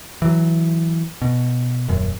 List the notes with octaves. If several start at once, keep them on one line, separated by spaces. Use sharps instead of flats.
E3 F#3
B2
D#1 F#2